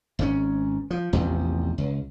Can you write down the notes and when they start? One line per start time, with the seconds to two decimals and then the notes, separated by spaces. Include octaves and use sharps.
0.19 G#1 G#2 C#3 C#4
0.91 F3
1.13 A1 E2 C3 F3
1.78 C#2